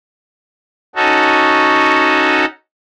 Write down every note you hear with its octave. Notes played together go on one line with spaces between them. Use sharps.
C#4 D#4 F#4 A4